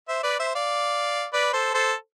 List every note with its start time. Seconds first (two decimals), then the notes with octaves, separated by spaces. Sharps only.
0.08 C5 E5
0.23 B4 D5
0.39 C5 E5
0.55 D5 F5
1.33 B4 D5
1.53 A4 C5
1.74 A4 C5